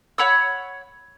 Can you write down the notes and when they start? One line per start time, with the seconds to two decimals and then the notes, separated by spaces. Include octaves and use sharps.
0.18 C#5 F#5 B5 E6